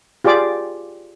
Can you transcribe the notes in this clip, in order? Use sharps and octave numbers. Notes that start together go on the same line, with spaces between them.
F4 G4 G#4 D5 D6